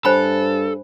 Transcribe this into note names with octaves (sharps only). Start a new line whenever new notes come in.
G2 A4 C5 G#5 B5